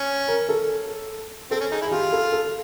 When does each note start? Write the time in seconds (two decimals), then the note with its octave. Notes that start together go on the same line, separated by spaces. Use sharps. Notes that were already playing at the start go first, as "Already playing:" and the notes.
Already playing: C#4
0.28 A#4
0.49 A4
1.51 C4 A4
1.61 C#4
1.71 D#4 G#4
1.81 E4
1.85 G#4
1.91 F4 G4
2.13 A4
2.32 A4